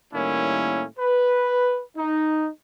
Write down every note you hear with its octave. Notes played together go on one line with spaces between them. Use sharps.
A2 D#3 G3 A#3 C#4 E4
B4
D#4